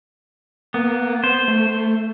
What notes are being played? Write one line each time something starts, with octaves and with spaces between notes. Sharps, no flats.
A#3 B3
B3 C5
A3